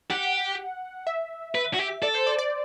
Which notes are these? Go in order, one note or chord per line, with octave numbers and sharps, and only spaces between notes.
G4 F#5
E5
B4
F#4
G4
A4 D5
C5
D5
D5